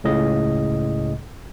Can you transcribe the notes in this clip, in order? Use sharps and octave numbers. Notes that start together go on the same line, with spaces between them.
C#2 A2 C#3 D#5